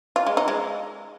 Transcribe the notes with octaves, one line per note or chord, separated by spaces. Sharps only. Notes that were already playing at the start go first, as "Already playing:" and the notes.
F4
G#3
D#4
G#3